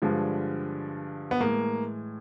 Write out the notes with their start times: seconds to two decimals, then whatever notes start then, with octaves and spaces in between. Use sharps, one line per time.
0.02 G2 D3 F3 G#3
1.31 B3
1.40 A2 E3 G#3 A#3